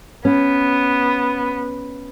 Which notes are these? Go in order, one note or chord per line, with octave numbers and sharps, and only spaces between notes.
B3 C#4